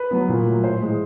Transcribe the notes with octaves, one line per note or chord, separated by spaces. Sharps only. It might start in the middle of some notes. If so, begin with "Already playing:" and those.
Already playing: B4
F#3 B3
A#2
F#3 A3
A2 C5
E3 G#3